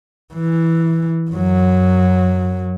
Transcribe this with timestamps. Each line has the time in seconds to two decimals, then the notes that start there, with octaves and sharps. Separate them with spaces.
0.34 E3
1.31 F#2 F#3